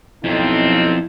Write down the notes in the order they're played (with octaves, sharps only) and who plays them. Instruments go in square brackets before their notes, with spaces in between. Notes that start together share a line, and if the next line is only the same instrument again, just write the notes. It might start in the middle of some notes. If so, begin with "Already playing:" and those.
[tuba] B1 [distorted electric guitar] F2 F3 [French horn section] A3 A#3 C4 [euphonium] E4